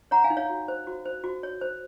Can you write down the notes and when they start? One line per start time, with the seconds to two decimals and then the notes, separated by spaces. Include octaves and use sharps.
0.11 C#5 F#5 A#5
0.24 F5 G#5
0.30 D#4
0.37 C#5 F5
0.50 F#4
0.68 C5
0.87 F#4
1.06 C5
1.24 F#4
1.43 C#5
1.61 C5